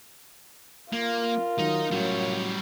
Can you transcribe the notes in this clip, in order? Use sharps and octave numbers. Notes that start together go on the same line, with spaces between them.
A#3 F4 A#4
D#3 F#3 D#4
A2 F#3 G3 C#4 C#5